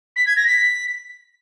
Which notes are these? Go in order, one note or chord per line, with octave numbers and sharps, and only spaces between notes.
B6
G#6
A#6
B6